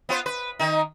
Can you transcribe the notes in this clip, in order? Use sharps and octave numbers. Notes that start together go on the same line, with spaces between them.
B3 F4 C5
B4
D#3 D#4